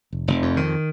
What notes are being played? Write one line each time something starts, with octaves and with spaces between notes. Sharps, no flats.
F1
F1
F2
D#3